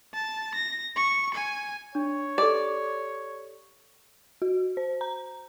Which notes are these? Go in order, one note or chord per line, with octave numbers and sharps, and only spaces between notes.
A5
A#6
C#6
G#5
D4 C#5
G4 A4 D5
F#4
C5
A#5